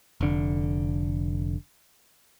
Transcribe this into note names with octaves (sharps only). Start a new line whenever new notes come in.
F1 D3